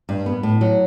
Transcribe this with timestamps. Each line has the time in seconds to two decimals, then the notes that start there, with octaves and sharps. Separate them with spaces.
0.09 G2
0.26 B3
0.43 A2
0.61 F#3